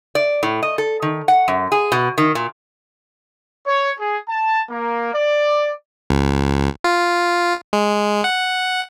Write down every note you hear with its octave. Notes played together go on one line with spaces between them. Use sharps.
D5
A2
D#5
A4
D#3
F#5
F#2
G#4
B2
D#3
A#2
C#5
G#4
A5
A#3
D5
C#2
F4
G#3
F#5